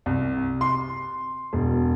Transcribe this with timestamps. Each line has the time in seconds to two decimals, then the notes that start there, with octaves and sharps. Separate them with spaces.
0.06 C2
0.61 C6
1.53 E1